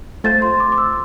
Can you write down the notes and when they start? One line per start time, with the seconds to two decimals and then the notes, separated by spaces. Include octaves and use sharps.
0.24 A3 C4 F4 C5 A6
0.42 C6
0.60 D6
0.72 D6
0.78 E6